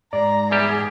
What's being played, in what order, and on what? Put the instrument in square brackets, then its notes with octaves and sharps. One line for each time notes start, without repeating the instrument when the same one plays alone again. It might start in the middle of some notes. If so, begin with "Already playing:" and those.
[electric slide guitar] G#2 G#3 [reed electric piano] D5 [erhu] A#5
[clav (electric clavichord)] E2 G3 G4 [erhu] G#4